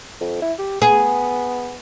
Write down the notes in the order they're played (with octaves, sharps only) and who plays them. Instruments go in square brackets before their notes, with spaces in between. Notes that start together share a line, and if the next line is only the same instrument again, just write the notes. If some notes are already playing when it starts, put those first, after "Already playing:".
[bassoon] F2
E4
G4
[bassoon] B3 [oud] G#4